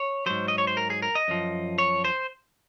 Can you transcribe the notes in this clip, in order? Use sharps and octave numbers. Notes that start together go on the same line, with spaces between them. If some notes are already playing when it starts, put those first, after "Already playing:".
Already playing: C#5
G#2 F#3 C5
D#5
C#5
C5
A#4
G#4
A#4
D#5
F#2 F3
C#5
C5